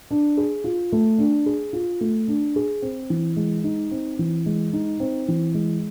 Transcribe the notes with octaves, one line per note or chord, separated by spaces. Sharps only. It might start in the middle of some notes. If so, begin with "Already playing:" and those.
D4
G#4
F4
A3
D4
G#4
F4
A3
D4
G#4
C4
E3
G#3
D#4
C4
E3
G#3
D#4
C4
E3
G#3